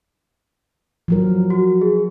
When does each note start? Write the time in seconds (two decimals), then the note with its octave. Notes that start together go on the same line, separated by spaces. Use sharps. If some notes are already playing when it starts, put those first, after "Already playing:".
1.08 F3 F#3 A#4
1.50 F#4
1.81 G#4